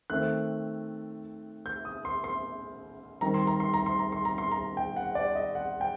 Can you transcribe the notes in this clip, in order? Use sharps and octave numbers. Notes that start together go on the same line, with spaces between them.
D#3 A3 C4 F#6
G6
D#6
C6
C6
D#3 G3 C4 A#5
C6
A#5
C6
A#5
C6
A#5
C6
A#5
C6
A#5
G5
F#5
D5
D#5
F#5
G5